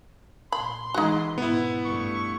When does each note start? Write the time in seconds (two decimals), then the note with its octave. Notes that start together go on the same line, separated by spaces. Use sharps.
0.52 A#2 B5 C6
0.94 E3 G#3 D#4 F#4
1.38 G#2 B2 B3 E4
1.85 G2 A3 C#6